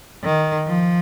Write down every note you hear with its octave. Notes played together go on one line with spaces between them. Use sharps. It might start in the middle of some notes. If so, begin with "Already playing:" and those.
D#3
F3